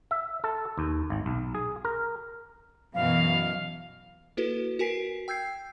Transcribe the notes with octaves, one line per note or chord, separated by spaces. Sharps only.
E5
A4
D#2
G#1
B1
G#4
A#4
F#2 B2 E3 F5
A#3 E4 F#4 A4 B4
F#4 A#4 G#5 B6 C7 D7
G5 E6 G6 G#6 C7